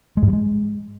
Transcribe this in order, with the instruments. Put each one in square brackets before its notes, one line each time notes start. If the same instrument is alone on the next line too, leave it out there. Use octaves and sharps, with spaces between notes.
[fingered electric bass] G#3
G#2
G3
G#3